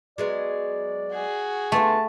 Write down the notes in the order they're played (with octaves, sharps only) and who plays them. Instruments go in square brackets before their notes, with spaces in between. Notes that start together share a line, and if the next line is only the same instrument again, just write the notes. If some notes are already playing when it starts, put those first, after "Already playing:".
[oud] F#3 G#3 B3 [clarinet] D5
[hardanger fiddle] F#4 G#4
[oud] D3 B3 F4 [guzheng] A3 [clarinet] A5